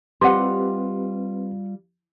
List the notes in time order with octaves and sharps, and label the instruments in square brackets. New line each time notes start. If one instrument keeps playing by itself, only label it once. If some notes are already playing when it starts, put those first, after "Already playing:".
[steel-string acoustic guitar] G3 F4 [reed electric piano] C4 B4 [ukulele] G4 D#5 F#5 [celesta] C6